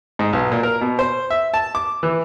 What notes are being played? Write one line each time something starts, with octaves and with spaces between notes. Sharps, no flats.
G#2
B1
A#2
A#4
B2
C5
E5
A5
D6
E3